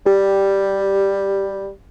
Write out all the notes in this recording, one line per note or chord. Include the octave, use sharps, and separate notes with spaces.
G3 G4